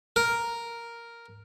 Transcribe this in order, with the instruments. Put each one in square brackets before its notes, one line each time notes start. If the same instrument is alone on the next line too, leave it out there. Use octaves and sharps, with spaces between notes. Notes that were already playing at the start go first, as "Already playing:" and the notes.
[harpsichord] A#4